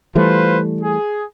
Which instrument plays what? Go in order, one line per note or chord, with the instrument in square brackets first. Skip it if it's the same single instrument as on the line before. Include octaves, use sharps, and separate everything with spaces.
[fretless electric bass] E3 G3 A3 [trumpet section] F4 B4 C5
[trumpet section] G#4